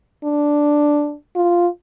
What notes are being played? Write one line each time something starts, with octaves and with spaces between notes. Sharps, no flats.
D4
F4